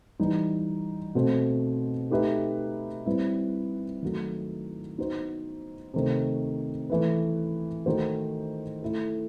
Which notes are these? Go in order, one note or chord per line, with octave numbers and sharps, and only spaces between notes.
E3 G3 D#4
B2 A3 C4
A3 D#4 G4 B4 E5
G3 C4 E4 B4
D#3 F#3 A3
B3 D#4 F#4 C5
C3 D#3 A3
E3 A3 E4 B4
D#3 A3 D#4 F#4 C5
A3 E4 A4